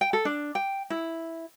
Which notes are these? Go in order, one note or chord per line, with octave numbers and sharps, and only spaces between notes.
G5
A4
D4
G5
E4